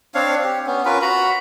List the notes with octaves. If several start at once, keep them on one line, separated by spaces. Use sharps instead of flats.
C4 D4 C#5 F5
G4
B3 C#4
C#4 F4 A#4 B4
F#4 A#5 B5